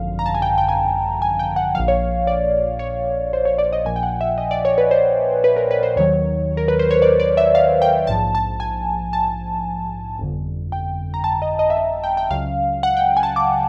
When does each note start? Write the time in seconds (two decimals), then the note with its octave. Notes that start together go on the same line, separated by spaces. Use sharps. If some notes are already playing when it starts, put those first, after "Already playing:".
Already playing: G#1 F#2 D3 F3 F5
0.19 A#5
0.26 A5
0.35 G#5
0.42 G5
0.58 G5
0.69 G#5
1.22 G#5
1.39 G5
1.56 F#5
1.75 A#1 A#2 F3 F5
1.88 C#5
2.27 D5
2.79 C#5
3.33 C5
3.45 C#5
3.58 D5
3.73 D#5
3.85 A#1 A#2 F3 G#5
3.96 G5
4.03 F#5
4.21 E5
4.38 D#5
4.51 D5
4.65 C#5
4.78 B4
4.91 C5
5.44 B4
5.56 A#4
5.71 B4
5.83 C5
5.96 D#2 D#3 F#3 C#5
6.57 A#4
6.68 B4
6.79 C5
6.91 C#5
7.02 D5
7.20 D5
7.37 E5
7.55 F5
7.82 G5
8.07 A#1 G#2 F3 A5
8.35 A5
8.60 G#5
9.13 A5
10.19 G1 F2 D3
10.72 G5
11.14 A#5
11.24 A5
11.42 D#5
11.59 D#5
11.70 E5
11.77 D#5
12.04 G5
12.17 G5
12.31 C#2 C#3 F#3 F5
12.83 F#5
12.97 G5
13.17 G#5
13.23 A5
13.36 D6